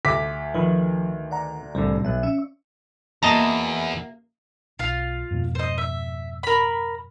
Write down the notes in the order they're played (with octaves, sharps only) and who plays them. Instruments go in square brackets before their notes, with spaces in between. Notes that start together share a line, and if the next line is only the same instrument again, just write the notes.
[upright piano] D2 D6 B6
[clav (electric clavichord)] D#3 B4 [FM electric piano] F3
[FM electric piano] D5 F#5 A#5
[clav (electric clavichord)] C2 D3 [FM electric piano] A2 G3
[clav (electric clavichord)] B1 [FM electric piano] E5 F#6
[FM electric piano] C#4 [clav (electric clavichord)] E5
[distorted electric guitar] E2 [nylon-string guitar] A#3 F#4 E5 [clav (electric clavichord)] D#5 A5 A#5
[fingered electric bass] B1 [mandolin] F4 F5
[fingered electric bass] F2 G#2 B2
[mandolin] C5 D#5
E5
A#4 B5